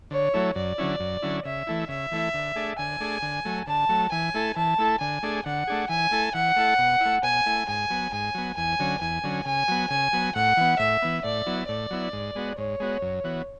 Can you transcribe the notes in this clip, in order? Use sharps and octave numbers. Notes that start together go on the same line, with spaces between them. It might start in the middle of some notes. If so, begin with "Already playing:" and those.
D3 C#5
F#3 A3 E4
F#2 D5
D3 F#3 C#4 E4
F#2
D3 F#3 C#4 E4
C#3 E5
E3 A3 E4
C#3 E5
E3 A3 E4
D3
A3 D4 G#4
D3 G#5
A3 D4 G#4
D3
F#3 A3
D3 A5
F#3 A3
E3 G#5
A3 E4 A4
E3 A5
A3 E4 A4
D3 G#5
A3 D4 G#4
D3 F#5
A3 D4 G#4
E3 G#5
A3 E4 A4
E3 F#5
A3 E4 A4
B2
E4
A3
B2 G#5
A3 E4
G#2 G#5
F#3 B3
G#2 G#5
F#3 B3
E2 G#5
D3 F#3 C#4
E2 G#5
D3 F#3 C#4
C#3 G#5
F#3 B3
C#3 G#5
F#3 B3
A2 F#5
E3 B3
A2 E5
E3 B3
A2 D5
F#3 B3 E4
A2 D5
F#3 B3 E4
G#2
G#3 B3 F#4
G#2 C#5
G#3 B3 F#4
F#2
E3 B3 F#4